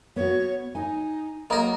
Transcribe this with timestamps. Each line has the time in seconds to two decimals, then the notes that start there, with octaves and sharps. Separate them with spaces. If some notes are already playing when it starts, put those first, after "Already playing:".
0.16 B3 F#4 C#5
0.75 D#4 G#5
1.50 F#3 A#3 A#4 D#5 A#5 D#6